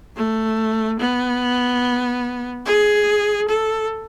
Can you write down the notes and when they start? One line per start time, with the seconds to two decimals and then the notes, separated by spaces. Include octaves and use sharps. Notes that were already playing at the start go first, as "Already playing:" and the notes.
0.16 A3
1.00 B3
2.66 G#4
3.48 A4